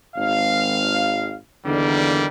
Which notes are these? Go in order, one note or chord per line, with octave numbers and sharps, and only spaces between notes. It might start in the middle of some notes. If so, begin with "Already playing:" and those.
G#1 F5
E2 D3 D#3 G3 A#3